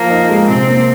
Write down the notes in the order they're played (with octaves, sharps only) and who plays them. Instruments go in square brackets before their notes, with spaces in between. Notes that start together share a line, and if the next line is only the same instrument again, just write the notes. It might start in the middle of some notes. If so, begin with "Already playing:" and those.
Already playing: [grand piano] F3 [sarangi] A#3
[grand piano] D#4
G#3
[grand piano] C3 [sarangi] C4
[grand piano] A#3